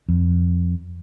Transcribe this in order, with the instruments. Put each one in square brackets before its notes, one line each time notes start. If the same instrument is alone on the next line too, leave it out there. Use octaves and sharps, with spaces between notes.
[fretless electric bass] F2